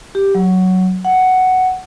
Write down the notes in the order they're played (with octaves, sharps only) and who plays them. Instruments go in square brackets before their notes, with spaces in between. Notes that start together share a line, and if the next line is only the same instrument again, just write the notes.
[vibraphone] G4
F#3
F#5